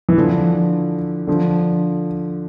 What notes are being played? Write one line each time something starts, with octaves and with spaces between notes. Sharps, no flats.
E3
D3 F3
D3 F3